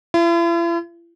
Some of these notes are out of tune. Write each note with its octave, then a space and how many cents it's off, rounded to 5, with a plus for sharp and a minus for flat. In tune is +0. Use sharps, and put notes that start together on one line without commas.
E4 +45